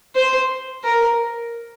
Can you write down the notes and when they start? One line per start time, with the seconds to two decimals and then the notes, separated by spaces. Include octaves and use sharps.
0.15 C5
0.84 A#4